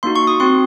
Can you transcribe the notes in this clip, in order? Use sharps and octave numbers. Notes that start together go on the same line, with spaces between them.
A#3 D#4 F#4 C6
C#6
D#6
C4 F#4 C6